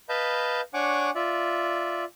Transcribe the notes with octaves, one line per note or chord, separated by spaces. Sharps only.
B4 D#5 F5 A5 B5 G6
D4 C#5 F#5 G#5 C#6 D6
F4 D5 E5